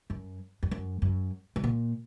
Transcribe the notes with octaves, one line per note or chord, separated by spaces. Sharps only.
F#2
F2
F#2
F#2
G#2
A#2